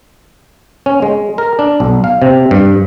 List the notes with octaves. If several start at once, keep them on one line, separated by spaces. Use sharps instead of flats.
C#4
G#3
A#4
D4
B1
F5
C3
G2